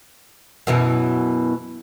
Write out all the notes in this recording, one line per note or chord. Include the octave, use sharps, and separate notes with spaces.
F#2 B2 E3